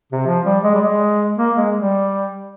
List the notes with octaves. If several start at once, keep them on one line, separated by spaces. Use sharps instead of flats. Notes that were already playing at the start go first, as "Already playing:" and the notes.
C3
F3
G3
G#3
G3
G#3
A#3
G#3
G3